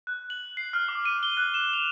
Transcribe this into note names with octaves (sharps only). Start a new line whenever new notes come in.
F#6
F#7
C7
F6
D6
D#7
G7
F#6
E7
F7